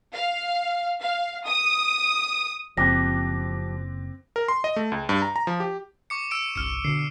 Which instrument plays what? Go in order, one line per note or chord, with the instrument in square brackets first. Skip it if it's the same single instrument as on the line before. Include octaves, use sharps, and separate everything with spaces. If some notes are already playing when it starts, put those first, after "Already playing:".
[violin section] F5
F5
D#6
[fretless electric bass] F#1 [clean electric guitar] F3 G4 [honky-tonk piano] C4 D6 F#6 [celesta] A#6
[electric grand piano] A#4
C6
D#5
A3
C#2
G2
A#5
A#5
F3
G4
[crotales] C#6 D6 C#7
E6 D7 E7
[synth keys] G1 C2 [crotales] F6 C#7
[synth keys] B2 D3 [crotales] C7